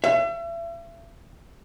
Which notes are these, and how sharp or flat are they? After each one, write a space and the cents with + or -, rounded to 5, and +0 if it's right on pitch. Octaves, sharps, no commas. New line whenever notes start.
E5 +40